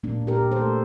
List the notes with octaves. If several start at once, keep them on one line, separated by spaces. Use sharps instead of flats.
A#2 A#3 D4
A#2
G4 A#4
A#2
A4 C5
A3